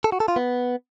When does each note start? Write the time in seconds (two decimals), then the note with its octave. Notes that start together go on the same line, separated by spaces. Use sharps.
0.04 A4
0.12 F#4
0.20 A4
0.28 F4
0.36 B3